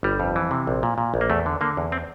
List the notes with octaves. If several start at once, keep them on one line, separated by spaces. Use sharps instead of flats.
G1 G3
F2
E3
C3
A#1
A#2
A#2
A#1
A#3
E2 A3
D3
D3 A#3
E2
C4